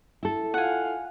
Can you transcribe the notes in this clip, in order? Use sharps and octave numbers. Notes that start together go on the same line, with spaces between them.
E4 A4
F4 F5 F#5 G#5